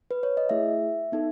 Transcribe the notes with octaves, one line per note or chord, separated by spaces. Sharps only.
B4
C#5
D#5
A3 E4 G#4 E5
B3 D#4 A4